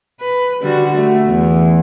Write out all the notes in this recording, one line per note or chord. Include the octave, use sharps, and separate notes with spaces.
B4
D3 G3 F#4
A3
E2